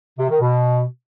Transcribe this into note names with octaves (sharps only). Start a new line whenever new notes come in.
C3
D#3
B2